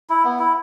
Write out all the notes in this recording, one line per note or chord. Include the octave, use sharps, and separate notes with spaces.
E4
B3
E4